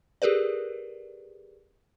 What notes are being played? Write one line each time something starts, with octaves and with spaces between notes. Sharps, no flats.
G4 G#4 A#4 B4 D5